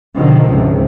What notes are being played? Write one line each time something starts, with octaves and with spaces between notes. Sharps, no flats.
B2 D3 D#3 F3
C#2 G#2 C3